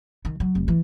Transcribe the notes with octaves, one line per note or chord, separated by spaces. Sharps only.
D#3
F#3
F1
E3